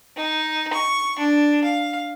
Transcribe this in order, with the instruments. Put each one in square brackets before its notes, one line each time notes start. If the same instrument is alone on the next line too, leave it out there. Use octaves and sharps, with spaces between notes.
[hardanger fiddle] D#4
C#6
D4
F5